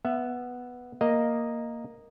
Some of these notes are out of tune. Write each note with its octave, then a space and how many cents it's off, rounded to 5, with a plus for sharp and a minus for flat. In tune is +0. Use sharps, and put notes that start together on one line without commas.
B3 +0 E5 +20
A#3 +0 D#5 +0